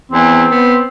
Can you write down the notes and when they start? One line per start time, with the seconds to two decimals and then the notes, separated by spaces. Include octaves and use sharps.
0.12 E2 C4
0.51 B3